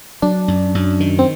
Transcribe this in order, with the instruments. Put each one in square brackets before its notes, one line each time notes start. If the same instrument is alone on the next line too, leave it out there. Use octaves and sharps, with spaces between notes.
[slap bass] F#3 [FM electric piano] D4
[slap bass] F#2
F#2
D#3
[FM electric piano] C4